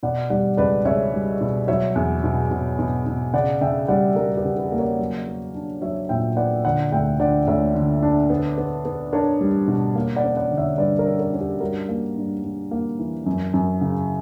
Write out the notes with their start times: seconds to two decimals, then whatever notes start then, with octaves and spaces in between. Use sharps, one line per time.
0.03 B2 D5 F#5
0.30 G3 D5 F#5
0.57 C#2 B4 D5
0.85 C#2 C#5 E5
1.14 G3
1.41 B2
1.68 F#3 C#5 E5
1.95 E2
2.24 B2
2.51 B2
2.79 B2
3.06 B2
3.33 C#3 D5 F#5
3.61 C#3 E5 G5
3.88 G3 D5 F#5
4.16 G3 F#4 A#4
4.37 G4 B4
4.45 C#3
4.57 G4 B4
4.72 A#3
4.78 A#4 C#5
4.99 F#3
5.27 B3
5.54 D4
5.82 F#3 C#5 E5
6.09 A#2 E5 G5
6.37 B3 D5 F#5
6.64 D3 D5 F#5
6.92 D2 E5 G5
7.20 D3 D5 F#5
7.47 D2 C#5 E5
7.75 D3
8.02 D4
8.30 B3
8.58 B3
8.85 B3
9.13 D4 A#4 C#5
9.41 G3
9.68 B2
9.95 A#3
10.16 D5 F#5
10.24 C#4
10.37 D5 F#5
10.51 D3
10.57 C#5 E5
10.78 G2 B4 D5
10.99 A#4 C#5
11.06 C#4
11.20 A#4 C#5
11.33 C#4
11.40 G4
11.61 G2 F#4 A#4
11.88 A#3
12.16 G2
12.43 G2
12.71 A#3
12.99 E3
13.26 F#2
13.54 F#2
13.81 C#3